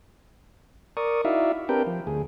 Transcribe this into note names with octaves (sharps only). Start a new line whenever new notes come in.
A#4 D5 C#6 D#6
D#4 E4 F#4 D5 E5 F5
C4 D4 G4 A#4 B4 G5
F3
D2 G#4